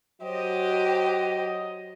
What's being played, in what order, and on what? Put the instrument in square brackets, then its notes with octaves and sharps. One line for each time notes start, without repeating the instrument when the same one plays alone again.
[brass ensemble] F#3 D#5 [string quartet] G4 C5